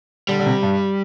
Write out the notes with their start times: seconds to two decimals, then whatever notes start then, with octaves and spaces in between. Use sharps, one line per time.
0.29 D3 G3
0.39 D3
0.46 C3
0.63 G2